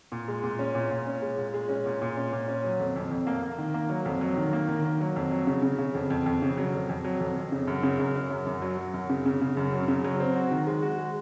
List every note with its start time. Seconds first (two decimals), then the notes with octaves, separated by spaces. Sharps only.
0.12 A#2
0.28 G#3
0.43 A#2
0.59 C#4
0.75 A#2
0.91 A#2
1.07 C#4
1.22 G#3
1.38 A#2
1.54 G#3
1.69 C#4
1.86 A#2
2.02 A#2
2.17 C#4
2.33 A#2
2.48 C#4
2.64 F#3
2.80 F2
2.96 F2
3.11 F2
3.27 A#3
3.43 A#3
3.58 D#3
3.74 A#3
3.89 F#3
4.06 F2
4.21 F#3
4.37 D#3
4.53 A#3
4.69 D#3
4.85 A#3
5.00 F#3
5.16 F2
5.31 F#3
5.47 C#3
5.63 C#3
5.79 C#3
5.95 F2
6.10 F2
6.26 F2
6.42 C#3
6.57 F#3
6.73 F2
6.89 F2
7.05 F#3
7.20 F2
7.37 F2
7.52 C#3
7.67 F#2
7.83 C#3
8.00 F#2
8.15 C#4
8.31 F#2
8.47 F#2
8.62 F#3
8.78 F#3
8.94 F#2
9.10 C#3
9.26 C#3
9.42 C#3
9.57 F#2
9.73 F#3
9.88 C#3
10.04 F#3
10.20 C4
10.36 F#4
10.51 D#3
10.67 G#3
10.82 F#4
10.98 G#3